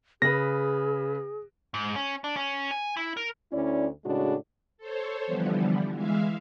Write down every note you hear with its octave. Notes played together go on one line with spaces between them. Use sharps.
C#3 G#4 B4 A#6
G#2
C#4
D4
C#4
G#5
E4
A#4
D2 C#4 E4 D5
A2 C#3 G#3 D4 F#4
A4 C5 C#5
D3 E3 F3 G3 B3
E3 G#3 E5 F5